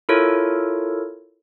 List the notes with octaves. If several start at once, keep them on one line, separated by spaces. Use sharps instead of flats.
E4 F4 A4 A#4 C#5